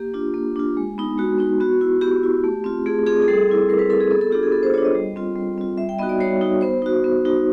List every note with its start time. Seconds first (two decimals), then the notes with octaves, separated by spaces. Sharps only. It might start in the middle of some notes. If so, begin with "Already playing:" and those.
Already playing: A#3 G4
0.14 D4 F4
0.34 A#3
0.56 D4 F4
0.77 G#3
0.98 B3 D#4
1.18 G#3 F#4
1.39 B3 D#4
1.60 B3 F#4
1.81 E4
2.01 B3 G4
2.23 E4
2.44 A3
2.64 C4 F4
2.86 A3 G#4
3.06 C4 F4 G#4
3.22 G#4
3.28 G3 A4
3.49 C4 E4
3.69 G3 A#4
3.79 B4
3.90 C4 E4 A4
4.00 G#4
4.11 B3 A4
4.21 A4
4.32 D4 F4 G4
4.43 G#4
4.52 B3 A4
4.63 C5
4.74 D4 F4 C#5
4.85 D#5
4.95 G3
5.16 C4 F4
5.36 G3
5.58 C4 F4
5.78 G3 E5
5.89 G5
5.99 B3 D#4 F#4 D#5
6.09 D5
6.20 G3 C#5
6.41 B3 D#4 F#4
6.61 B3 C5
6.82 D#4 F#4
7.04 B3
7.25 D#4 F#4